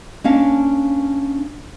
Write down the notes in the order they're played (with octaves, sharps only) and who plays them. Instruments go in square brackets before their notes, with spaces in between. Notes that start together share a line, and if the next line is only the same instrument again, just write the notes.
[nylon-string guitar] A#3 C#4 D4 F5 A5